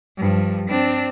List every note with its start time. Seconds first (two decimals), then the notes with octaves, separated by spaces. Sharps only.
0.17 G2 F3
0.69 C4 D4